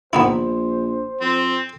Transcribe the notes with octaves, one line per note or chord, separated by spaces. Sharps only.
A#1 B3 D#4 E4 C5
F2 C4